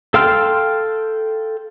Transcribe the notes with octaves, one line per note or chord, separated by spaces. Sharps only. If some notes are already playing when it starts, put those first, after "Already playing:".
A4 F5 G5 C6 F6